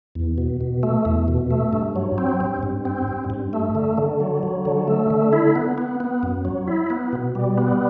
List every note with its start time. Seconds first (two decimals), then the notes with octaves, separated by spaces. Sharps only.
0.15 E2
0.38 B2
0.61 B2
0.83 A3
1.05 E2
1.28 B2
1.51 A3
1.73 G2
1.96 F#3
2.18 C4
2.40 G2
2.63 G2
2.85 C4
3.08 G2
3.30 G2
3.53 A3
3.75 D3
3.98 D3
4.20 F#3
4.43 F#3
4.65 D3
4.88 A3
5.10 D3
5.33 E4
5.55 B3
5.78 B3
6.00 B3
6.23 F#2
6.45 F#3
6.67 E4
6.90 B3
7.13 B2
7.35 G3
7.58 B3